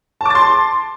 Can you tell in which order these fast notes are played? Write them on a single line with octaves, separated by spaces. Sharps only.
A5 D6 A6 C6